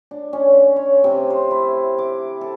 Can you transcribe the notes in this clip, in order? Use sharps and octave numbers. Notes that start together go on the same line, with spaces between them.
D4
C#4
C#5
C3
C5
E4
D6
A4